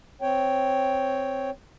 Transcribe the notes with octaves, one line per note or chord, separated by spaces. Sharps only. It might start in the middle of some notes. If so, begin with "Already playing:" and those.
C4 C#5 G5